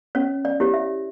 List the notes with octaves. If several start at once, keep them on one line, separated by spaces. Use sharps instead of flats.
C#4 C#5
D5
E4 G4 C#5
E5